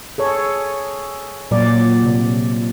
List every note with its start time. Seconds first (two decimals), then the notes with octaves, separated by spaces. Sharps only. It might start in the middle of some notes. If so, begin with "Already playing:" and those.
0.18 G#4 A4 C#5
1.51 A#2 F#3 D5
2.04 C3